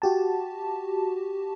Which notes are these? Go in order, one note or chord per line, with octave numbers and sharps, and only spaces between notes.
F#4 G4 A5